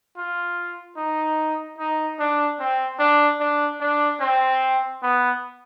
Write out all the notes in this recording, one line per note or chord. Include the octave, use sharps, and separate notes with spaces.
F4
D#4
D#4
D4
C4
D4
D4
D4
C4
B3